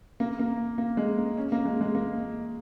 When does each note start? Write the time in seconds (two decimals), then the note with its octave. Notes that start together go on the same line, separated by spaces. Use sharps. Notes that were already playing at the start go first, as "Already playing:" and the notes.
0.20 A#3
0.39 A#3
0.78 A#3
0.97 G#3
1.18 A#3
1.37 C#4
1.52 A#3
1.65 G#3
1.81 G#3
1.95 A#3